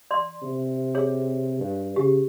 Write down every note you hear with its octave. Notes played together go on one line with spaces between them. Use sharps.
D5 C6
C3
G#4 C#5
G2
C#3 G4